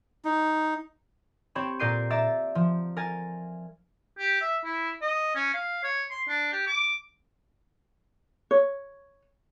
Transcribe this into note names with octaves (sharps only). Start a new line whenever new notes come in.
D#4
C4 G4 C#5 B5 E7
A#2 A#4 D5 G6 C7 D#7
D5 E5 A#5 E6 A6
F3
A#4 G#5 A6
G4
E5
E4
D#5
C#4
F5
C#5
C6
D4
G4
D6
C#5